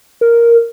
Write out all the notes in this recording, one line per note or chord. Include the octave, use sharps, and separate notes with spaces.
A#4